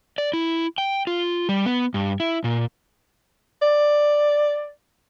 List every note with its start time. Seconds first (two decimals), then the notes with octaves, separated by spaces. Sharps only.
0.18 D5
0.33 E4
0.78 G5
1.07 F4
1.49 G3
1.66 B3
1.94 G2
2.20 E4
2.44 A#2
3.62 D5